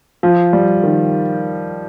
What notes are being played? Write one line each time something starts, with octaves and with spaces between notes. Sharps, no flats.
F3
G3
D#3